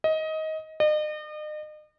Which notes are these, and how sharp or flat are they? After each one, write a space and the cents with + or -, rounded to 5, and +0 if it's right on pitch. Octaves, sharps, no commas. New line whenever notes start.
D#5 +20
D#5 -40